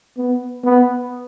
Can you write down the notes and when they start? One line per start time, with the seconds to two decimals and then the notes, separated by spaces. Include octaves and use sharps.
0.18 B3
0.64 B3